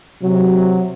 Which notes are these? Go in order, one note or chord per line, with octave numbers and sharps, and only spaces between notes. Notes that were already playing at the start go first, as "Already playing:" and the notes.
C3 F#3